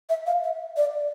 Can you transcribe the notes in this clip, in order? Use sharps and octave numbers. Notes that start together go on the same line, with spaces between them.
E5
F5
E5
D5